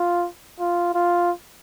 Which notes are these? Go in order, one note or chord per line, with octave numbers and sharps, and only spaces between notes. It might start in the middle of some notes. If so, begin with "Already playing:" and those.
Already playing: F4
F4
F4